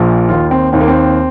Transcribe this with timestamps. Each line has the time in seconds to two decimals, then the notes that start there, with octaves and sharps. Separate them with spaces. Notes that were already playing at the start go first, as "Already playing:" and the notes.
Already playing: A#1 A#2 F3
0.29 D#2 D#3 F4
0.51 C4
0.73 D#2 D#3 C4
0.81 A#3
0.88 C4